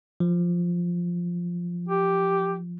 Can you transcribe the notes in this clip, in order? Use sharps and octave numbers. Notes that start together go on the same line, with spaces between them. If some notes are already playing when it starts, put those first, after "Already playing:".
F3
G4